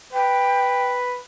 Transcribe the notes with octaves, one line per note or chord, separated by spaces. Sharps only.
B4 G5